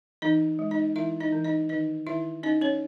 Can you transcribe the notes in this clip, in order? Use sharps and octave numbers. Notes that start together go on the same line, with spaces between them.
E3 D#4 D#5
G#3
D#4 D#5
E3 E4 E5
D#4 D#5
E3
D#4 D#5
D#3 D#4 D#5
D#3 E4 E5
C#4 D#4 D#5
C#4 C#5